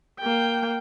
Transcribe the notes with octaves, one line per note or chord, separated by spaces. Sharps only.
A#3 G5